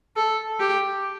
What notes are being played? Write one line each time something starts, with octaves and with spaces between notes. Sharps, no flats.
A4
G4